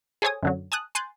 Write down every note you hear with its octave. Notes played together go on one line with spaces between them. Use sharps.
G#4 A4 C5 C#5 G#5 D#6
F#2 D3 F#3
G#5 A5 D#6 F#6
G#5 C6 F#6 G6 A6